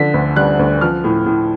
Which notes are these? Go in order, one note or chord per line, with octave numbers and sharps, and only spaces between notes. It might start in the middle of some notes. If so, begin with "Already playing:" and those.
Already playing: D3 F3 B6
D2
G3 F#6
D2
F3 F6
A2
A2